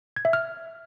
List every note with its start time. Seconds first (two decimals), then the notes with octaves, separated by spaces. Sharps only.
0.16 G#6
0.25 E5
0.33 F6